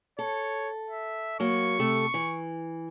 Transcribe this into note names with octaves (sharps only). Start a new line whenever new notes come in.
A4 C#5
E5
F#3 A#3 C#6
C3 A3 A4
E3